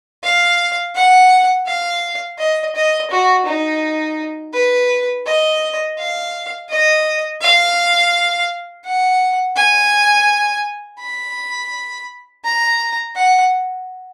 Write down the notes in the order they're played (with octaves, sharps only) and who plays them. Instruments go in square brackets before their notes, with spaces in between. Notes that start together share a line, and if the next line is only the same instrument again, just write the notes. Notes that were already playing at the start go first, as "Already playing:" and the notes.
[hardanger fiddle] F5
F#5
F5
D#5
D#5
F#4
D#4
B4
D#5
F5
D#5
F5
F#5
G#5
B5
A#5
F#5